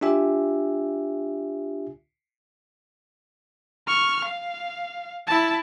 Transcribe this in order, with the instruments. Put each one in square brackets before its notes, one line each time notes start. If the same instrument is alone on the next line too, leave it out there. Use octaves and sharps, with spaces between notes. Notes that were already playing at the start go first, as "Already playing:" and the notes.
[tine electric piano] D4 F4 G4 E5 G#5
[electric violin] C#6 F6
F5
E4 A5